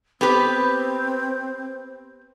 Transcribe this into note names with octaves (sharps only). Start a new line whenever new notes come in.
B3 C4 G4 B4